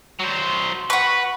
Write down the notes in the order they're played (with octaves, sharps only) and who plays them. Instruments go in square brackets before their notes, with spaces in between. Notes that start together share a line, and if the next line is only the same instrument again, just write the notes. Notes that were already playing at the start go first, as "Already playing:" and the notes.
[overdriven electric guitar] F#3 C5
[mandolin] F#4 C#6 [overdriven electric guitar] B4